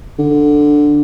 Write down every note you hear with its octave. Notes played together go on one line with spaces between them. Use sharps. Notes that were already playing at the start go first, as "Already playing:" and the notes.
D3